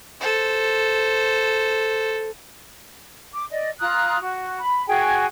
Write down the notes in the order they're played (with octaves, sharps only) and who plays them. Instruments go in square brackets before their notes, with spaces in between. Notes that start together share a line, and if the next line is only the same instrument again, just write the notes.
[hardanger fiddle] A4 C5
[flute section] D6
D5 D#5
F4 A#5 D#6 F#6
F#4
B5
F#4 G#4 G5 G#5